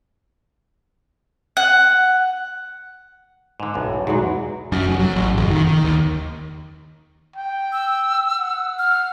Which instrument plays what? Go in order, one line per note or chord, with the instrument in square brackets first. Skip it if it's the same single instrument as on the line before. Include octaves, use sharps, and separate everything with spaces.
[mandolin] F#5
[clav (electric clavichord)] G#2 D3
B1 F#2 A2
[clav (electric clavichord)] E2 [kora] G#2 B2 F#3
[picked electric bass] F#2
F1
F#3
A1
F#1
D#3
D#3
D#2
[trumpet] G5
[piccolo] E6
[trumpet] F#5
[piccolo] F6